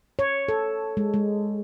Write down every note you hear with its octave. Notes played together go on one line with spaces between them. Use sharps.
C#5
A4
G#3
G#3